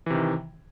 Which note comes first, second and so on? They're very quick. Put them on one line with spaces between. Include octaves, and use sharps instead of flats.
E3 C3 D#3